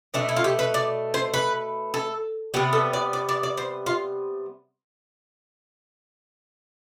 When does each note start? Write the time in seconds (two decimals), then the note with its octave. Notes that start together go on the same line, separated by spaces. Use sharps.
0.14 B2 A3 D4
0.29 E4
0.36 F4
0.44 G4
0.59 B4
0.74 D5
1.14 C5
1.34 B4
1.94 A4
2.54 C3 G3 B3 G4
2.73 A4
2.93 D5
3.13 D5
3.29 D5
3.43 D5
3.57 C5
3.86 F4